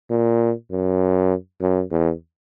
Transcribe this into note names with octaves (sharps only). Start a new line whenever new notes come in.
A#2
F#2
F#2
E2